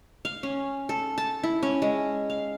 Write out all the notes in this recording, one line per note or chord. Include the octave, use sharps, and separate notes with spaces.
F5
C#4
A4
A5
E4
C#4
G#3
F5